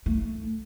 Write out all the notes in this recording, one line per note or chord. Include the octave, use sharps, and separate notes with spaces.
A3